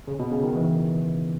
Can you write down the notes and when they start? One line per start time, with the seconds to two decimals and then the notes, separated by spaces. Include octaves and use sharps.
0.07 C#3
0.19 B2
0.32 C#3
0.44 D#3
0.56 E3